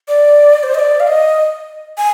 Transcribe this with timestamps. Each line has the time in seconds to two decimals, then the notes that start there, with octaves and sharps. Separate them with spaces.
0.08 D5
0.63 C5
0.74 D#5
0.79 D5
1.00 F5
1.07 D#5
1.98 G#5